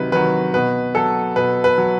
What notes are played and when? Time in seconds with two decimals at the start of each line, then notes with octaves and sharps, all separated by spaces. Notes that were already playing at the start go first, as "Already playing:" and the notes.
Already playing: C3 D#3 F#3 B4
0.12 D#3 F#3 B4
0.54 B2 B4
0.95 F#3 A4
1.36 B2 B4
1.64 B4
1.78 F#3